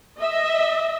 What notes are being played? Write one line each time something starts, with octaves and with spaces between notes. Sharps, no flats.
D#5 E5